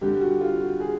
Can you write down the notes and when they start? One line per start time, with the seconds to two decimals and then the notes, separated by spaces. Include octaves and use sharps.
0.01 G2 D3 G3 G4
0.21 F#4
0.41 F4
0.61 F#4
0.80 G#4